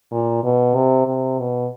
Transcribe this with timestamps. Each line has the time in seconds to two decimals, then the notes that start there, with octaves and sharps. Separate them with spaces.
0.12 A#2
0.43 B2
0.75 C3
1.07 C3
1.39 B2